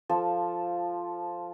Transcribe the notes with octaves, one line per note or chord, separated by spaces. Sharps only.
F3 A4